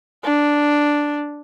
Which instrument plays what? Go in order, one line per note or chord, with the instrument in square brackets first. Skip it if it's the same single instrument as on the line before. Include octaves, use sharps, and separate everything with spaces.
[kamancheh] D4